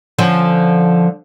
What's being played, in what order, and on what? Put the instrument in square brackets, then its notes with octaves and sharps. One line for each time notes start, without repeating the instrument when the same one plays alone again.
[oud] D3 F3 C#4